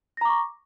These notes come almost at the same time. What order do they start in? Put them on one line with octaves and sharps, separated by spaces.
A#6 A#5 D6 C#6